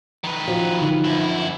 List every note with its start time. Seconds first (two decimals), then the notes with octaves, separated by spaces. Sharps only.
0.24 D#3 B4
0.48 F3 F#4
0.81 D3 D#4
1.04 F#2 E4